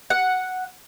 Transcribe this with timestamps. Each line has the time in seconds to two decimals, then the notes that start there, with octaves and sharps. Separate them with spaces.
0.10 F#5